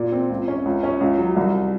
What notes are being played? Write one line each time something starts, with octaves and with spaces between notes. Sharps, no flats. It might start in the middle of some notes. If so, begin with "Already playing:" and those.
Already playing: A#2
C4
C#2
C#4
C#2
C#4
C#2
F#3
C2